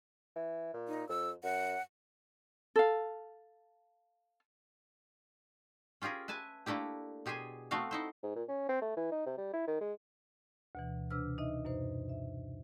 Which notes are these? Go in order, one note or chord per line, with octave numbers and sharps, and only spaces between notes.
E3
A#2
D#4
F2 E6
F#2 F#5
A4 F5
C#4 F4 G4 G#4 A#4
B4 E5 G#5 A5
A3 A#3 D4 E4 G4
B2 G4 G#4 C5 G#5
A3 B3 C4 F#4 F5
D#4 E4 C5
G#2
A#2
C#4
C4
A3
E3
D#4
C3
G3
E4
D#3
G#3
D2 B2 E3
C3 D4 B4 E6 F6
D#4 D#5 E5
F#2 B2 D#4 C5
E5